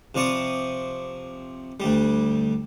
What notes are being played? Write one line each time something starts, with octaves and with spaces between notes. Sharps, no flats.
C3 F3 D5 C#6 D#6
D2 G3